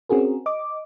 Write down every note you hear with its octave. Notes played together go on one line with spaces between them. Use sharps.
C4 C#4 F#4 G#4 A#4
D#5 D6